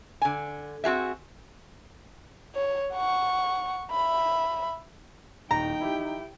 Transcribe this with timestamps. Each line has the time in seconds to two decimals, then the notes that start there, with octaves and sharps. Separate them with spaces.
0.22 D3 G#5
0.84 C4 F#4 G#4 E5
2.55 C#5
2.93 F#5 C#6
3.91 E5 B5
5.51 D#1 D#4 G5 A#5
5.81 E4 G4